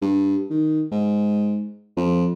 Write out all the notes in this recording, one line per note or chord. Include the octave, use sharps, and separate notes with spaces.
G2
D#3
G#2
F2